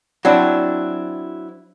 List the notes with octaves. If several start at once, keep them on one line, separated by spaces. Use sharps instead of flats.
F#3 C4 D4 E4